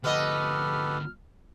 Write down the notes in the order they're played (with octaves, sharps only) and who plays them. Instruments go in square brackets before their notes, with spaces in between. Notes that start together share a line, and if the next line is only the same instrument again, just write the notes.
[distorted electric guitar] D2 F3 [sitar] B3 D#5 [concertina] G4 A4 B4 [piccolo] F6